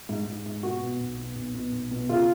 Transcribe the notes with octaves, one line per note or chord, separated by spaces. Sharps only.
G#2
G#2
G#2
B2 F#4
B2
B1
B2
B1
B2
B1
B2
C#3 F4